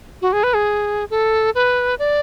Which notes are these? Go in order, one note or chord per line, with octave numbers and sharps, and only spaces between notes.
F#4
G#4
B4
G#4
A4
B4
D5